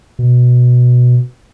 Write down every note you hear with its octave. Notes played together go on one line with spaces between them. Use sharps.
B2